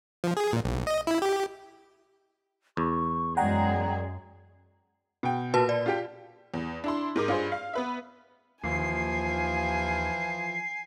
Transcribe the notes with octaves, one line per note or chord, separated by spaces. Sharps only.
F3
G#4
A#2
B1
D#5
E4
G4
E2 C#6
F#2 G#3 G#4 D5 F#5 G5 A#5
B2 G5
A#2 F#4 B4 A5
D5
F4 G4 G5
E2
D4 E4 C6
G#2 A#4 D6
G2 F4 G#4 C5
F5
B3 B4 E5
D#2 E3 F3 G#5 C7